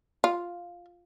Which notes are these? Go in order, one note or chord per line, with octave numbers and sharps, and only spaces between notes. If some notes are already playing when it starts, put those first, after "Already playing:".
F4